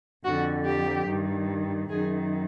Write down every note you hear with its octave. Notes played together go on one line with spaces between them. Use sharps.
F2 D3 F#4
G4
G2 D#3
F#2 D#3 G#4